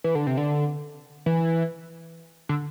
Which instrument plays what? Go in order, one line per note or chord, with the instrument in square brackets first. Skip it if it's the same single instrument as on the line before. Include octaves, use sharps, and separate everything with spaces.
[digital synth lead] E3
D3
C3
D3
E3
D3